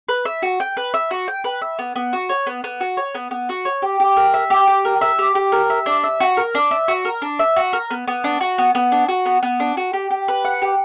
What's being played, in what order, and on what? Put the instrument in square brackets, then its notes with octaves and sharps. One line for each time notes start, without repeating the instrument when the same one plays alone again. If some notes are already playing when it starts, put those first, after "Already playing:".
[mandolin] B4
E5
F#4
G5
B4
E5
F#4
G5
B4
E5
B3
B3
F#4
C#5
B3
B3
F#4
C#5
B3
B3
F#4
C#5
G4
G4
A#4
E5
G4
G4
A#4
E5
G4
G4
A#4
E5
D4
E5
F#4
A#4
D4
E5
F#4
A#4
D4
E5
F#4
A#4
B3
B3
D4
F#4
B3
B3
D4
F#4
B3
B3
D4
F#4
G4
G4
B4
F#5
G4